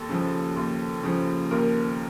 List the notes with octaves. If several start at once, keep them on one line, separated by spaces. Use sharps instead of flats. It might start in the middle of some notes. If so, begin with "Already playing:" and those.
Already playing: D#2 A4
C#3 F3
D#2
C#3 F3
D#2 A#4